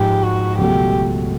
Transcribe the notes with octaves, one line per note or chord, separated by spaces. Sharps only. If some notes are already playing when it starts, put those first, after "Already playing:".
Already playing: G#2 F3 G#3 G4
F#4
C#2 B2 F#3 A3 G4